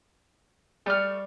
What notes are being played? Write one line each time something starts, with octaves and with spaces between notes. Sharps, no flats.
G3 A3 F6